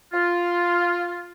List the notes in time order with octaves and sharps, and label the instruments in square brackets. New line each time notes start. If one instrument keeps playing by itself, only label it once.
[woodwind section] F4